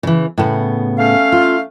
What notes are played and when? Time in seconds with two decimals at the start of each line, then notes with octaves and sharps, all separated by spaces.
0.03 C#3 E3
0.38 A2 C#3 B3
0.98 A3 C#4 F5
1.32 F4